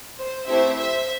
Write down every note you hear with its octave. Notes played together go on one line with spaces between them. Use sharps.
C5
A3 C4 E4 G4 C5 E5
C5 E5